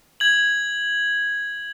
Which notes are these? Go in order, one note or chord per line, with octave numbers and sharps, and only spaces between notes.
G#6 F#7